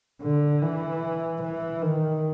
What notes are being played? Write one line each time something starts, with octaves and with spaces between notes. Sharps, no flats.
D3
E3
E3
D#3